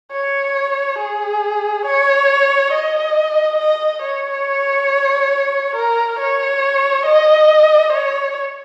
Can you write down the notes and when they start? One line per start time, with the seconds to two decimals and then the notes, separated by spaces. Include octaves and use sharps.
0.12 C#5
0.99 G#4
1.85 C#5
2.72 D#5
3.58 D#5
4.02 C#5
5.76 A#4
6.19 C#5
7.06 D#5
7.93 C#5